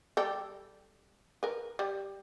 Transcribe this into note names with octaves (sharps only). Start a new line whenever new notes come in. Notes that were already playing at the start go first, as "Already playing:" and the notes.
G3 G4 A4
A#4 B4
G3